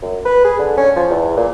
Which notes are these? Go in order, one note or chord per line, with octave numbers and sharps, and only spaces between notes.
F#2
B4
G#4
D3
C#4
F3
E2
A#2